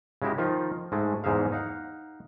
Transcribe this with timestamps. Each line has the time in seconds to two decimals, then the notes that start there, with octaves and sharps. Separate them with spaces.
0.22 C#3 G#3 E4 F#4 G4
0.38 D#3 F3 D#4 F4
0.92 G#2 G#3 A3
1.24 E2 G#2 G#3 D#4 E5 F5
1.52 D#4 F5 F#5